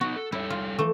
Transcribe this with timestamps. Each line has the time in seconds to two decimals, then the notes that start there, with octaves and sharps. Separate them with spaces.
0.01 B3 D#4 F#4
0.16 A4
0.32 G3 E4 A4 C#5
0.50 F4
0.79 E3 F3 A3